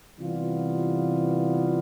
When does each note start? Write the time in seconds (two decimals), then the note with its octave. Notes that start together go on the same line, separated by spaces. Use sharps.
0.18 C3 E3 G3 B3 F4